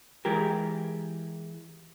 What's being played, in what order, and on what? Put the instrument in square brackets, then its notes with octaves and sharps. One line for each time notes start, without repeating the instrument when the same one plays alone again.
[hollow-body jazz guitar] E3 G#3 G4 A#4